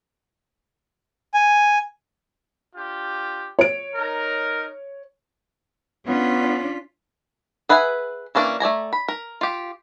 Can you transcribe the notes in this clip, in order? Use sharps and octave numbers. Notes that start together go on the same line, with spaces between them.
G#5
D4 F4 G4
C#5 D7
D#4 A#4
B3 C#4 D4 F4 B6
G#4 B4 E5 F#5 G#5
E3 A#3 C#4 D4
A3 D5 G#5 A#5
B5
A#4
F4 G4